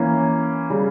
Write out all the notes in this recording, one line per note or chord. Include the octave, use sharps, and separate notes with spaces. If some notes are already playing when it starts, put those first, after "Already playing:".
Already playing: E3 A#3 C#4
C#3 G3 C#4